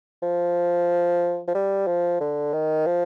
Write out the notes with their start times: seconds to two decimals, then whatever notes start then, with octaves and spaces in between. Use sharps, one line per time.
0.22 F3
1.48 F3
1.55 G3
1.87 F3
2.21 D3
2.53 D#3
2.86 F3